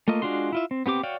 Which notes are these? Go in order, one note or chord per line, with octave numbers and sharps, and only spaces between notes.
A3 A#3 F4 D#5
G#3 D4 F4 F#4 C6
E4 F4 E5
C4
B3 C4 G4 D6
F#4 C#5 D5 F5 G5